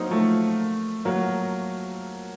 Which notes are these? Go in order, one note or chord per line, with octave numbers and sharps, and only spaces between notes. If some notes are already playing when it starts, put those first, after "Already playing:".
Already playing: F#3 A#3 C4 D#4
F3 A3
F#3 A#3